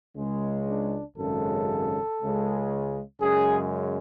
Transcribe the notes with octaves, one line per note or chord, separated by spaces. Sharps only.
C#2 C#3 G#3
D4
G#1 F#2 C#3 G#3 A4
C#2 C#3 G#3
F#2 C#3 G#3 G#4